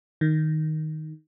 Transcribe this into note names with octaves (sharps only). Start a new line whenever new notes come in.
D#3